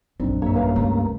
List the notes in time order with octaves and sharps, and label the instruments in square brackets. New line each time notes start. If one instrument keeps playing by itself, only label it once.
[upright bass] A#1 F#2 [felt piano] C4 D4 D#4
[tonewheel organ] G2 A#3 [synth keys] C#5 E5
[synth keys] C#4 F5 [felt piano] B4 C#5
[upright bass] C#2 [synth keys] A3